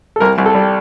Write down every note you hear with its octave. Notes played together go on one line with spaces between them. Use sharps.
A4
C2 A#4
C2
A4
G3